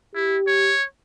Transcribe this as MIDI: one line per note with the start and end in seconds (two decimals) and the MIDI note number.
0.15 0.37 64
0.15 0.72 67
0.47 0.84 73